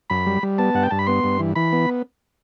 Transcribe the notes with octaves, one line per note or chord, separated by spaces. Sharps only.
F#2 B5
G3
G3
B3 A5
G2 F#5
G5
G2 A5
B5
B3 C6
G2
E3
E3 B5
B3